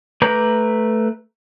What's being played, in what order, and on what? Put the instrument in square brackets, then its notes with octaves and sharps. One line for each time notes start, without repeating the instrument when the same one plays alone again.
[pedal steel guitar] A3 B4 A#5 D6 G6